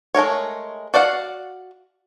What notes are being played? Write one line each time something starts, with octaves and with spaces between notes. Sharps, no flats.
G#3 A3 A#4 C#5
F#4 D5 F5 F#5